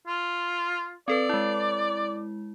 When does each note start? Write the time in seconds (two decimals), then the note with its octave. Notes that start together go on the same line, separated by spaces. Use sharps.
0.07 F4
1.08 C4 A4 B4 D5
1.29 G#3 E4